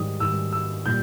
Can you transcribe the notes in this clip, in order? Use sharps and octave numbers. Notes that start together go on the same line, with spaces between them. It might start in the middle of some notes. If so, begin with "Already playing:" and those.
Already playing: G#2 D#3 G3 D#6
G#2 D#3 G3 E6
E6
A#2 G3 G6